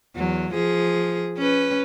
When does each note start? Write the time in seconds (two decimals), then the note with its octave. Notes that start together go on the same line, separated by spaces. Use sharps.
0.15 E2 F#3
0.53 F3 G#4
1.37 C#4 B4